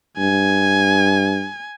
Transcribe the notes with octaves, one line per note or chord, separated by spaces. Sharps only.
G2 G#5